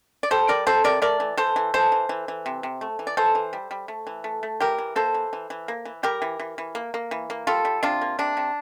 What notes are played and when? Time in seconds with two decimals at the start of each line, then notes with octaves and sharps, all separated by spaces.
0.23 D5
0.31 G3 A4 C5
0.48 G3 A#4 D5
0.66 C3 A4 C5
0.84 C3 A#4 D5
1.02 A3 A#4 D5
1.20 E3
1.37 E3 A4 C5
1.56 E3
1.74 E3 A4 C5
1.92 E3
2.09 E3
2.28 E3
2.46 C3
2.63 C3
2.81 A3
2.99 E3
3.07 D5
3.17 E3 A4 C5
3.35 E3
3.53 G3
3.71 G3
3.88 A3
4.07 E3
4.24 A3
4.43 A3
4.60 E3 G4 A#4
4.78 E3
4.96 A#3 A4 C5
5.14 E3
5.33 E3
5.50 E3
5.68 A#3
5.85 E3
6.03 G3 G4 A#4
6.22 E3
6.40 E3
6.58 E3
6.75 A#3
6.94 A#3
7.11 E3
7.30 A#3
7.47 G3 F4 A4
7.65 G3
7.83 C3 D4 F4
8.01 A#3
8.19 C3 D4
8.37 C3